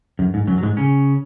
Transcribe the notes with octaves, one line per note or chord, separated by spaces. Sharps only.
F#2
G#2
F#2 F#3
F#3
G#2 G#3
C#3 C#4